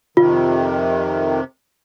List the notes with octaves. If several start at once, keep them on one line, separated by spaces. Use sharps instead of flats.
F2 C3 D#3 F4